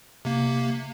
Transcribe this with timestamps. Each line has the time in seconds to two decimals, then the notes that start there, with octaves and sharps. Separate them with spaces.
0.25 C3 A#3